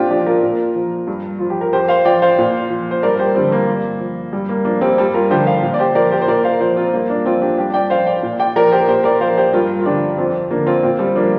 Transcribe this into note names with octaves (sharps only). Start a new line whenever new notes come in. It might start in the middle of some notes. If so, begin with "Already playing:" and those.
Already playing: A#2 C4 D4 F4 G4
F3 D4 G4
F4 A#4
A#2
F3
G2
F3 F4
G4
A#4
F2 G4 C5
C5 F5
F3 D5 G5
C5 F5
A#2
F3
C5
G2 A#4 D5
A#4
G4 C5
D3 F3 G3 C4
A#3
G2
F3
G2 G3
A#3
F3 A#3 D4
G3 C4
G2 G3
F4 A#4
D3 F3 G4 C5
C5 F5
A#2
D5
G4 C5
F3 A#4 D5
G4 C5
C5
A#2 A#4 D5
C5 F5
F3 C5 F5
C4 F4
G2 A#3
A#3 D4
F3 C4 F4
D4 G4
G2 D4 G4
D5 G5
F3 C5 F5
D5 G5
A#2
D5 G5
F3 A#4 D5
G4 C5
A#2 G4 C5
A#4 D5
F3 C5 F5
G4 C5
G2 F4 A#4
F4
D3 F3 D4 G4
F2 C4 F4
D3 F3 A#3 D4
C4 F4
A#2 C4 F4
G3 C4
F3 A#3 D4